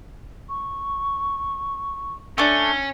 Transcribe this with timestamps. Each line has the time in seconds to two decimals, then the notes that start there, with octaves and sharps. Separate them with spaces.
0.49 C#6
2.38 A3 C#4 D4 G7